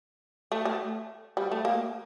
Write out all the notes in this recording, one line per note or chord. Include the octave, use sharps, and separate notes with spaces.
A3
A3
G3
A3
A#3